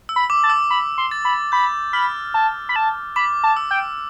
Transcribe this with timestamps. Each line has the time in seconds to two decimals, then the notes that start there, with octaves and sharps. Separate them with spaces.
0.09 E6
0.16 B5
0.30 D6
0.44 A5
0.50 E6
0.70 B5
0.98 C6
1.11 A6
1.25 B5
1.52 B5 G6
1.93 B5 F6
2.34 A5
2.69 B5
2.76 A5
3.16 B5 D6
3.44 A5
3.56 E6
3.71 G5